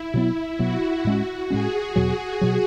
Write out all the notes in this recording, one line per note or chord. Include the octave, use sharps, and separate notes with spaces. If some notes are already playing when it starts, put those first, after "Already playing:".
Already playing: E4
B2 F#3 B3
B2 F#3 B3 F#4
A2 G#3 C#4
A2 G#3 C#4 G#4
E2 B2 F#3
B2 F#3